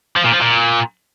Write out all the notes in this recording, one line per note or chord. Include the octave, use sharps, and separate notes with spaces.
F3
A#2
F3
A#2